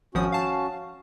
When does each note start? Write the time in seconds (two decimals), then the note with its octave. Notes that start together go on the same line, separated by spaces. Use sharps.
0.15 G#1 F3 C#4 F#4 D#6
0.32 F5 A5